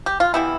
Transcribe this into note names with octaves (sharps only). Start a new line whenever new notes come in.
G4
F4
E3 G3 B3 E4